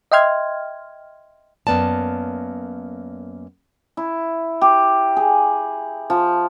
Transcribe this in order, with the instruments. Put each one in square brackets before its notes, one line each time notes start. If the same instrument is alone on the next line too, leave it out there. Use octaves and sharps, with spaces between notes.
[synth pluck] D#5 E5 G5 C6 F6 G#6
[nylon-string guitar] F#2 A#3 B3 D5 A5
[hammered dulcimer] E4
G4
G#4
F3